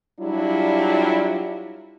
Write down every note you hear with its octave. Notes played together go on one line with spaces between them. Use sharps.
F#3 G3 D4 E4 F4